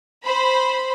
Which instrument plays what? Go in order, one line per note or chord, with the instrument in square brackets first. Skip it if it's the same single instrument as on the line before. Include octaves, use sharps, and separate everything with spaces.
[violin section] C5 B5